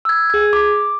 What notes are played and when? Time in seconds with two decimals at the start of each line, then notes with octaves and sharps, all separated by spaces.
0.05 E6 G#6
0.30 G#4 G#6
0.53 D6